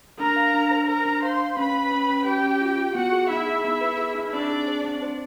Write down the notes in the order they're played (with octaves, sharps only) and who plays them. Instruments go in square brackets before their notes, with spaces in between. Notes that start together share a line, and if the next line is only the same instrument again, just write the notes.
[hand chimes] D4 [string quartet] A#4 A#5
[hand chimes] F5
D4
C5
[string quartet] A#4 A#5 [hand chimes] C5
[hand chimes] D4
[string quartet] C5 C6 [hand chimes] F5
[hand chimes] F5
[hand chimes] C#4 [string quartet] B4 B5
[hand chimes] C#4
C#4
C#4
[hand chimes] C#4 [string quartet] G4 G5
[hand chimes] C#4
F4
F4
[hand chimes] B3 [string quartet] F#4 F#5
[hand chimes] G#4
[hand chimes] D#4 [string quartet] E4 E5
[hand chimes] G#4
B3
B4
G#4
D#4
[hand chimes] C4 [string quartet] D4 D5
[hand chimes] G#4
C5
C4
C5